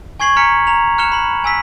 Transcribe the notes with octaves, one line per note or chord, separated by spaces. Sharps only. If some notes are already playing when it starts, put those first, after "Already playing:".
G#5 C#6 G#6 C7 F#7
G#5 A#5 F6 B6 C#7
A#5 F7
F6 F#6 C#7 E7 F7 G7
B5 F#7
G#5 E6 B6